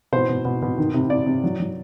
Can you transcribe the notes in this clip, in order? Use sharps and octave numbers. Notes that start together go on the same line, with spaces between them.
B2 C5
B2
B2
B2
D#3
C3
C3 D5
C3
F#3
F#3